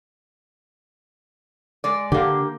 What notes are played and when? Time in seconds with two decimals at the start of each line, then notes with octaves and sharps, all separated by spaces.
1.84 G#3 D5
2.12 D3 A#3 G4